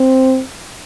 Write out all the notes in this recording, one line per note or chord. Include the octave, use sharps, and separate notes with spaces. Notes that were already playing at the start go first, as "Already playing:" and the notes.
Already playing: C4